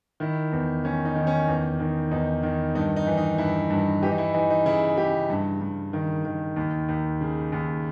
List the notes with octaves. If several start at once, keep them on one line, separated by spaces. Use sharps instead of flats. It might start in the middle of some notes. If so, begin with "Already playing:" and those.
D#3 E4
E2
D#3 C#4
D#4
D#3
C#4
E2
D#3
E2 D#4
D#3
G2 D#4
D#4
E3
D#4
G2 E4
G2
E3 G4
D#4
E4
E3 D#4
D#4
C#3 E4
C#3 G4
G2
G2
D#3
D#3
D#2
D#2
C#3
D#2